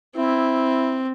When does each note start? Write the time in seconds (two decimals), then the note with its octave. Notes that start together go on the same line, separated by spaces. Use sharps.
0.16 C4 E4